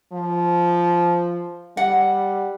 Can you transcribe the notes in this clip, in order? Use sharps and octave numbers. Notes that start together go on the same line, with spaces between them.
F3
G3 F#5